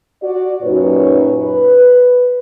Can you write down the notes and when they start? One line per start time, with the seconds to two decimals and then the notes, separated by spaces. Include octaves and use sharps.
0.23 F#4 D5
0.63 F#2 A#2 D#4 G4 B4 C#5
1.37 B4